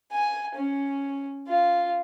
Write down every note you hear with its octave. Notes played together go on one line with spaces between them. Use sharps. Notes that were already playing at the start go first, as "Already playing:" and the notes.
G#5
C#4
F4